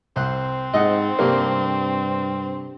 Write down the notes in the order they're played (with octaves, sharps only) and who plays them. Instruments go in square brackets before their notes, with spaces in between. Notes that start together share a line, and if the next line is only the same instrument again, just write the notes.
[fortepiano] C2 [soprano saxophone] C4 [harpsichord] C5 F#5
[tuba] G#2 [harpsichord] D#4 A4 [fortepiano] D#5 F#5
[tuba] G2 [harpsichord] C3 G3 A3 [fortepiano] A#3